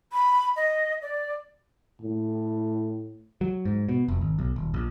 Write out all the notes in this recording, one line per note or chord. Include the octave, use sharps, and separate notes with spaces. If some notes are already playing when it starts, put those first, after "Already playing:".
B5
D#5
D5
A2
F#3
G#2
B2
F1
G#1
B1
D#1
A#1